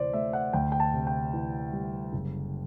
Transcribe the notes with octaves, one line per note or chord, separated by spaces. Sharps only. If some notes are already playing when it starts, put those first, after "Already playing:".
Already playing: D2 C3 E3 C5 D5
A3 E5
F#5
D2 G5
G5
A5
C3
G5
E3
G3
F#1